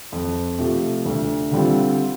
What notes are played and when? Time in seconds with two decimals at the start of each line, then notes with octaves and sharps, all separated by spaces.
0.12 F2
0.59 C3 F3 A3
1.06 D2
1.52 D3 G3 C4 F4